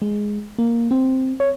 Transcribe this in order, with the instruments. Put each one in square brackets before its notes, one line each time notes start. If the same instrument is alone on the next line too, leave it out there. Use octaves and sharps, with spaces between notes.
[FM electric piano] G#3
A#3
C4
C#5